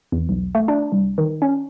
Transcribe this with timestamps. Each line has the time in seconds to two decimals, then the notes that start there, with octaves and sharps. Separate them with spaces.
0.12 E2
0.29 B1
0.55 A3
0.68 D4
0.92 C2
1.18 D#3
1.42 C#4